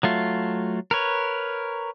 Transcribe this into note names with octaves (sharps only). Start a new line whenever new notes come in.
F#3 A3 F4
A#4 B4 C#5